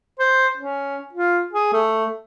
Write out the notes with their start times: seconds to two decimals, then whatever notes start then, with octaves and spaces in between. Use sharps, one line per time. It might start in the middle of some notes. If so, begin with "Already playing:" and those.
0.19 C5
0.57 C#4
1.13 F4
1.53 G#4
1.73 A3